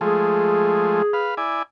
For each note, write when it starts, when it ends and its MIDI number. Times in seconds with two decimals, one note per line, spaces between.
0.01 1.02 53
0.01 1.02 56
0.01 1.02 57
0.01 1.42 68
1.13 1.35 71
1.13 1.35 77
1.37 1.63 64
1.37 1.63 74
1.37 1.63 80